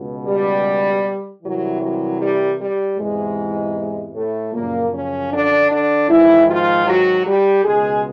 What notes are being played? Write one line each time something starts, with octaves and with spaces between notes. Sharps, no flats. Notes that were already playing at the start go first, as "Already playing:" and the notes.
Already playing: C#2 B2
G3
C2 C3 E3 F#3
F#3
G3
G3
E2 G#2 C3 E3 G#3
A2 A3
F#2 A#2 C#3 F3 A#3
C#3 C#4
D3 D4
D3 D4
G#2 D#3 E3 E4
F3 F4
F#3 F#4
G3 G4
C#2 B2 G#3 G#4